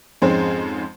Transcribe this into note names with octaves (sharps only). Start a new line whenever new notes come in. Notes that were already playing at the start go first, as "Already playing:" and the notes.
F2 G#2 G#3 C4 C#4